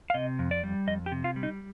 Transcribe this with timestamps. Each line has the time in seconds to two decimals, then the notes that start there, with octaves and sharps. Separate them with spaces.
0.10 F5
0.14 C3 D#5
0.39 F2
0.51 D5
0.63 G3
0.87 F2 D#5
1.06 G4
1.12 C3
1.24 F4
1.36 G3
1.43 D#4